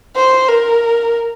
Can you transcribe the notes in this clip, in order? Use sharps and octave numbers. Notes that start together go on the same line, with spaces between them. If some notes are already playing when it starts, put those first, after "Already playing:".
C5
A#4